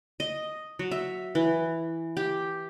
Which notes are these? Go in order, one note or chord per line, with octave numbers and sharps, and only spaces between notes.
D#5
F#3
E5
E3
G4